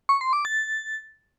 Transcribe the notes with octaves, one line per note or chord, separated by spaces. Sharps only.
C#6
C6
D6
A6